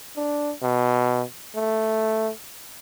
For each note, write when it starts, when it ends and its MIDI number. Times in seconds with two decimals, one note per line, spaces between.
0.16 0.53 62
0.62 1.23 47
1.55 2.30 57